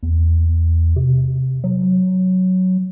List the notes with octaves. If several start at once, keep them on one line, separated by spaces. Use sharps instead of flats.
E2
C3
F#3